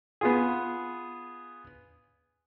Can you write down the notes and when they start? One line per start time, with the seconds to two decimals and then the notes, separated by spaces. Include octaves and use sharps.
0.21 B3 F4 G#4